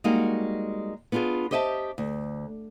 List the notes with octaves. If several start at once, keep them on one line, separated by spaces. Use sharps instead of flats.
G3 G#3 A#3 D#4 F#4 G#4
B3 D4 F4 G4 G#4
G4 C5 D#5 E5 G5 A5
D2